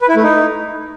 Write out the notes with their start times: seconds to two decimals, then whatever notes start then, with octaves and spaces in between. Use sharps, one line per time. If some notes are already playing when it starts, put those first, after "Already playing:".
0.02 B4
0.09 E4
0.16 A3
0.23 D#4